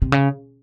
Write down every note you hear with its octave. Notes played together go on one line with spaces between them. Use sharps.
C3
C#3